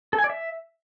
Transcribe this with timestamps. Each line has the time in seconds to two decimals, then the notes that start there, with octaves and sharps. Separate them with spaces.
0.13 A4
0.19 G#5
0.24 D5
0.30 E5